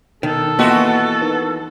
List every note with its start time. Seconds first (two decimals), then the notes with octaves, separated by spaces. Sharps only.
0.23 B2 D#3 A4
0.59 E3 A#3 B3 F4 F#4 D#5 E6
1.21 D#4 A#4 B4